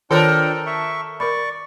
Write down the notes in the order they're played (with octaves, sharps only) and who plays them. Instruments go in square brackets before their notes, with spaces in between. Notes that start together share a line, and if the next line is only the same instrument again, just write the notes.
[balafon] D#3 F4 C#5 [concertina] D4 G5 [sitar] A4 A#4
[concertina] E5 C#6
[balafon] A#4 B5 [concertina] D5 C#6